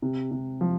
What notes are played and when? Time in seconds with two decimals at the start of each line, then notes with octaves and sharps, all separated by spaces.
0.02 C3
0.31 C3
0.61 F3